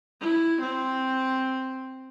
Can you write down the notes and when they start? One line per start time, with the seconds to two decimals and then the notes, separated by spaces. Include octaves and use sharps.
0.20 E4
0.61 C4